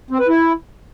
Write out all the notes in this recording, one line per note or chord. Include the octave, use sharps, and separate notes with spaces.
C4
B4
E4